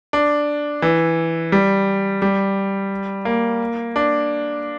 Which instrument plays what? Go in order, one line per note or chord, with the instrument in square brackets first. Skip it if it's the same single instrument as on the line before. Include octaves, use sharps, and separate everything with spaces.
[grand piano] D4
E3
G3
G3
A#3
D4